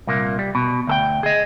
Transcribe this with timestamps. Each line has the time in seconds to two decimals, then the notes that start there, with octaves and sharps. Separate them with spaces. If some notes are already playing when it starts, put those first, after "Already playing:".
0.07 C2 A#2 A#3
0.39 G3
0.55 B2
0.87 D2 A4 G5
1.23 G#4 D#5